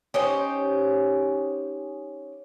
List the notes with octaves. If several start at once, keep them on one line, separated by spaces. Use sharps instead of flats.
C#4 D#4 G4 C5